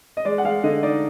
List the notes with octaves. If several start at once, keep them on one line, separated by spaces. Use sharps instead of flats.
D#5
G#3 D5
F#5
G#3 F5
D3 D#5
D#4 D5